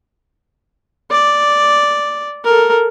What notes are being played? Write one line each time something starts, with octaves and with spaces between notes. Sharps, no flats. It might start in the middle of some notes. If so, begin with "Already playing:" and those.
D5
A4 A#4